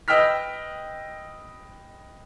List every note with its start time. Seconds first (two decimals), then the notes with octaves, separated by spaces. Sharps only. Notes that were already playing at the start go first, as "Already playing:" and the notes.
0.08 B4 D#5 G5 E6 F6 B6